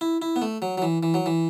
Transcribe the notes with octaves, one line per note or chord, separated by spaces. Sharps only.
E4
E4
B3
A3
F#3
F#3
E3
E3
F#3
E3